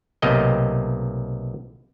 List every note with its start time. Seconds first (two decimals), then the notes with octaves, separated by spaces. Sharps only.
0.22 B1 C3 A3 A#3 D#5 G5